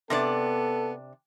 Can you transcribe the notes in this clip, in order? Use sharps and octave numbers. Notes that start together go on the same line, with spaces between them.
C3 B3 D4 A4 D5